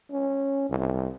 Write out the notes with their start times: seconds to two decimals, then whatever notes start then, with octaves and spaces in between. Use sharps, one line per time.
0.11 C#4
0.69 C2